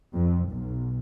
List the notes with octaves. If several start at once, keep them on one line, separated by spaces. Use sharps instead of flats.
F2
B1